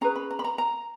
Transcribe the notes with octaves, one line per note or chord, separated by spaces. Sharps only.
C#4 G#4 B4 A#5
B5
A#5
B5
A#5
A#5